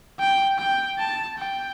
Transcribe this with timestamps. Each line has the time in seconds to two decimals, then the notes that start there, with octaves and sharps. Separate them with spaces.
0.20 G5
0.58 G5
0.99 A5
1.38 G5